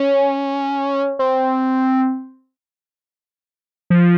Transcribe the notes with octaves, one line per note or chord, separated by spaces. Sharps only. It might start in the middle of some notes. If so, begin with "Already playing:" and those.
Already playing: C#4
C4
F3